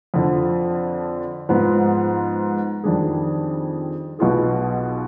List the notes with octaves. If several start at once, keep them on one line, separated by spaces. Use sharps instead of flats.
F2 D3 F3
G#2 F3 B3
F2 D#3 G3 D4 G#4
B1 B2 B3 F4 G#4